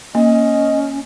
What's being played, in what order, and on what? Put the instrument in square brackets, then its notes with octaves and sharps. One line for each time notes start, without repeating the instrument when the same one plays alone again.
[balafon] A#3 [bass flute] C#4 [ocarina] D#5